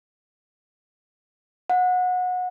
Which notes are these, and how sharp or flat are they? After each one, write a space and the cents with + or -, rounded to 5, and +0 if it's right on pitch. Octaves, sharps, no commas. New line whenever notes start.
F#5 -25